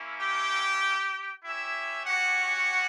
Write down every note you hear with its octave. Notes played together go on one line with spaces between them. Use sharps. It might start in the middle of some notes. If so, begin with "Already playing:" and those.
Already playing: A#3 C#4 E4
G4 G5
C#4 E4 G4 E5
F#4 F#5